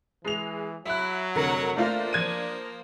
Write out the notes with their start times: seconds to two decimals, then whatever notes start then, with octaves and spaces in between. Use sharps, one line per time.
0.25 E3 G#3 F7
0.86 F#3 E4 E5 F#6
1.35 F1 D3 A#4 C#5 F#5
1.76 A3 A#3 D4 F4 C5 F5
2.13 F3 G#6 D#7